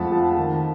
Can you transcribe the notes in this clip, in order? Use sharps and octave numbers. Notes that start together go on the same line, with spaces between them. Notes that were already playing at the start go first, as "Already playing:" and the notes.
Already playing: F2 F3 G#3 F#5 A5 B5
F3
D#3